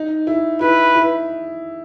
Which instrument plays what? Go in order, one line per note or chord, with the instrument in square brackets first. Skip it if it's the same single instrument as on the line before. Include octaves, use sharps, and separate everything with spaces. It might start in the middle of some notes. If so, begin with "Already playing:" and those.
Already playing: [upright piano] D#4
E4
[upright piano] E4 [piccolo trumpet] B4
[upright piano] E4